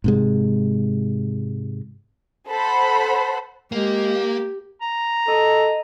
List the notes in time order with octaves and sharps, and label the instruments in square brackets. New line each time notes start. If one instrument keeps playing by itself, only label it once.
[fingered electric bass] G#2 C3 G#3
[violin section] A4 C5 F#5 B5
[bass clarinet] G#3 [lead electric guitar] A#3 [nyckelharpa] G4
[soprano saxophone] A#5
[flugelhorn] A4 [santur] D#5